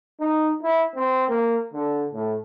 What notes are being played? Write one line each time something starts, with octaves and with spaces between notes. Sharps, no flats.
D#4
E4
C4
A#3
D3
A2